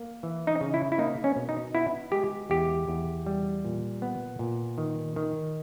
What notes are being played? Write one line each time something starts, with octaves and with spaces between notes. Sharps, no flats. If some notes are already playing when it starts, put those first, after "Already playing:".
Already playing: A#3
E3
D#4
C#3
E4
E4
A#3 D#4
C#4
B2
D#4
B3 E4
G#3 G4
E2 G4
E2
G3
A#2
B3
A#2
D#3
D#3